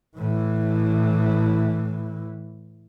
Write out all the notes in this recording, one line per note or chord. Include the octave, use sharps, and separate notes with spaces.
A2 E3